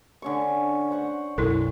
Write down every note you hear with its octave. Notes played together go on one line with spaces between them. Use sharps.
D3 C#4 C#6
C5 F#5 C#6
B1 F#2 E4 A4 A#4